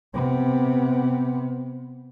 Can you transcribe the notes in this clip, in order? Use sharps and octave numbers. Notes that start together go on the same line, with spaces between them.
C3 B3